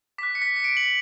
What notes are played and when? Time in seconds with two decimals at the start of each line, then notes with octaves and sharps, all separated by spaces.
0.18 D6 F#6 B6
0.35 C#7
0.42 B6
0.57 C#7
0.64 D7
0.77 F#7